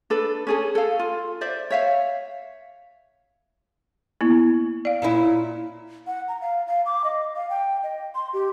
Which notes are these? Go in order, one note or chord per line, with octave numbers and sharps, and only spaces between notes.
D4 A4 B4
C#4 G#4 A4
A4 F5
F4
C5 D5 E5
C#5 E5 F5
A#3 B3 E4
D5 F5
A#2 C#4 E4
F#5
A#5
F5
F5
D6
D#5
F5
G5
D#5
C6
G4